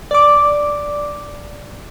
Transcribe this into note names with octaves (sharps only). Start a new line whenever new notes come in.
D5 D6